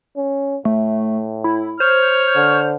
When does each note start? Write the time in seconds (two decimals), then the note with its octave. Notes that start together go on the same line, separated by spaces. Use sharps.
0.16 C#4
0.65 A2 A3
1.44 E4
1.80 C5 C#5 F6
2.35 D3